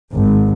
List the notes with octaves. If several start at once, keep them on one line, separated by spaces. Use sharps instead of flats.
G#1